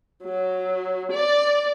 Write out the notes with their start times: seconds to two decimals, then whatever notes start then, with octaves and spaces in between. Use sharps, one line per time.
0.24 F#3
1.12 D5